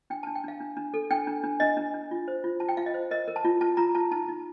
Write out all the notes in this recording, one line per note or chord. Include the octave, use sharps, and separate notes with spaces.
D4 G5
D4 A5
G5
D4 F5
D4
D4
A4
D4 G5
D4
D4
D4 D#5
D4
D4
F4
C5
F4
F4 A5
G5
F4 F5
D#5
C5
A#4 D#5
A#4
A5
F4
F4 A5
F4 A#5
F4 A5
D#4 A5
D#4